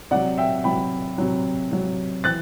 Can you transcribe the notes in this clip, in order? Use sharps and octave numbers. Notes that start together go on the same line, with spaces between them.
C3 F#3 D5 F#5
E5 G5
C3 F#3 G5 B5
C3 F#3
C3 F#3
E3 F#6 A6